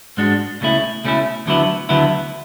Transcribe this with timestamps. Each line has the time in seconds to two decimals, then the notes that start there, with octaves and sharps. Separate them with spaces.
0.17 G#2 G#3 D4 F#4
0.61 C#2 B2 A3 C#4 E4
1.04 C#2 B2 A3 C#4 E4
1.46 D2 D3 F#3 B3 E4
1.89 D2 D3 F#3 B3 E4